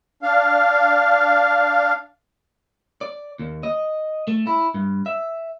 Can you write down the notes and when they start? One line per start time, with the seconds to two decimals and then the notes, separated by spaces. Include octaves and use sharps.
0.23 D4 F5
3.01 D5
3.39 D#2
3.63 D#5
4.27 A3
4.47 E4
4.74 G2
5.06 E5